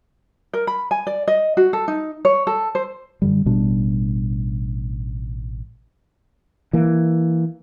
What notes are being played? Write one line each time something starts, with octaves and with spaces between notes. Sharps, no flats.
A#4
B5
G#5
D5
D#5
F#4
A4
D#4
C#5
A4
C5
F#2 D3 G3
A1 B2 G3 D4
E3 A#3